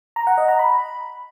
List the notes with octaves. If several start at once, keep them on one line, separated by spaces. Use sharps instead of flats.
A#5
F#5
D#5
A#5
B5